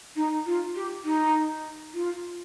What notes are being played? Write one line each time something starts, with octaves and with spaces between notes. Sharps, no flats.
D#4
F4
G4
D#4
F4